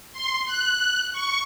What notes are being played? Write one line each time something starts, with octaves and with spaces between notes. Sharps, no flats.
C6
F#6
C#6